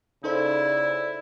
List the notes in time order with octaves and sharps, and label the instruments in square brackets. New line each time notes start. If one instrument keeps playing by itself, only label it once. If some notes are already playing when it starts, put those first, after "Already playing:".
[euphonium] C#3 [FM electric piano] D#4 A4 C5 [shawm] E4 [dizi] D5